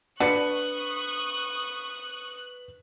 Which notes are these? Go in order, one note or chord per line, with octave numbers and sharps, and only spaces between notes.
D3 B4 C#6 D#6 F#6 C#7